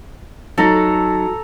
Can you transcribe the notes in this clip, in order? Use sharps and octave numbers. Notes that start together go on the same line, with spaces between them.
F#3 D#4 A4 A#5